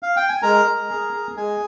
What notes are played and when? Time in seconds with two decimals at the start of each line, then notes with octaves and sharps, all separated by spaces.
0.03 F5
0.16 G5
0.29 G#5
0.42 G#3 A#4 A#5
0.65 G#3
0.89 G#4
1.13 G#4
1.37 G#3 G#4 G#5